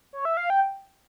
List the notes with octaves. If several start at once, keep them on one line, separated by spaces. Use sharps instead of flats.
C#5
E5
F5
G5